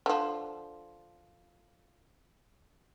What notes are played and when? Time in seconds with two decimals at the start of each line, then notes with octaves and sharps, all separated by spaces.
0.06 D3 F3